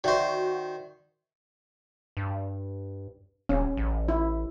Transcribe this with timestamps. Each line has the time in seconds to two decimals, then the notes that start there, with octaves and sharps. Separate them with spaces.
0.04 D#3 F#4 C5 D5 E5 C#6
2.17 G2
3.49 D#1 C#4
3.77 A1
4.08 E4